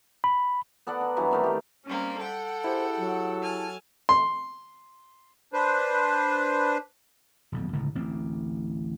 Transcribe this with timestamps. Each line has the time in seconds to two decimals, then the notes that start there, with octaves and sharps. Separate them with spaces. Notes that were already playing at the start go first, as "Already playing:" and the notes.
0.24 B5
0.87 B3 A4 D5 F#5
1.01 D#4
1.16 G2 E3 F#3
1.31 C3 D#3 A3
1.44 D#3 G4
1.86 G3 A#3 C4 C#4
2.21 A4 F#5 G5
2.64 E4 G4 G#4 C5
2.97 F#3
3.42 G#5 A5 F6
4.09 C6
5.53 D4 B4 C5
7.52 D#1 B1 F2
7.73 G1 C#2 A2
7.95 A1 D2 C4